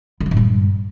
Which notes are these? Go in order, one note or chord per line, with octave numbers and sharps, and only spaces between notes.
D3
F#3
A2
G2